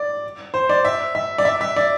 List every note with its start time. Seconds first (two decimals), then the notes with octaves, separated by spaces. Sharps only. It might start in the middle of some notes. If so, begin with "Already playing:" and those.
Already playing: D5
0.54 C5
0.69 D5
0.85 E5
1.15 E5
1.38 D5
1.45 E5
1.61 E5
1.76 D5